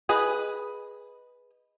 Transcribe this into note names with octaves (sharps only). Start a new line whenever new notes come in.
G#4 B4 D#5